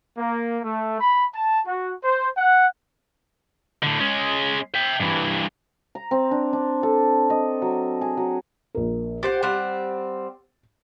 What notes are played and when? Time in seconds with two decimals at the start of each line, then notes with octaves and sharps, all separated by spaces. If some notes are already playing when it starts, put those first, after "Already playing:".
0.17 A#3
0.63 A3
1.00 B5
1.34 A5
1.66 F#4
2.04 C5
2.36 F#5
3.82 A2 D3
4.00 G#3 C#4
4.75 E5 G5
5.00 G2 E3
5.95 A#5
6.11 C4
6.31 D4
6.53 D4
6.83 A4
7.30 D#5
7.62 F#3
8.01 G#4
8.17 F#3
8.75 A#1 A#4
9.23 G4 C5 F#5 A6
9.43 G3 C4 F#5